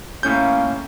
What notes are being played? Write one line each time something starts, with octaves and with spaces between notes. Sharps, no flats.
A2 A#3 C#4 G6